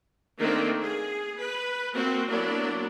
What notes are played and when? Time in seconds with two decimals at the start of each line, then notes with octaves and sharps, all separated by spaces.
0.39 D#3 A3 A#3 C4 D4
0.80 G#4
1.39 B4
1.91 A#3 C4 F#4
2.28 F#3 A#3 B3 D4 E4